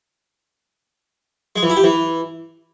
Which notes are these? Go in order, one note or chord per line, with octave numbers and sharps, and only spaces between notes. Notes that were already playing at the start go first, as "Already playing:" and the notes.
G#3
E3
E4
G4
E3